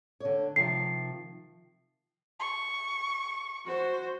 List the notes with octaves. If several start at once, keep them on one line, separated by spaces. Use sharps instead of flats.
D3 C#5
C3 D#3 F3 C7
C#6
F#4 C5